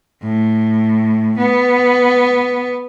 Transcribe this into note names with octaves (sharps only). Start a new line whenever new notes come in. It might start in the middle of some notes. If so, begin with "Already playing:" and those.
A2
B3